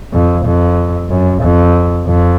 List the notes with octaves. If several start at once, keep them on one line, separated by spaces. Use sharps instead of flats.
F2
F2
F#2
F2
F2